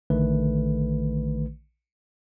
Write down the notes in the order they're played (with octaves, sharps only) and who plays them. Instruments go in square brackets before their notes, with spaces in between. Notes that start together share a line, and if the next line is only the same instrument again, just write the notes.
[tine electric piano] A#1 D3 D#3 A3 B4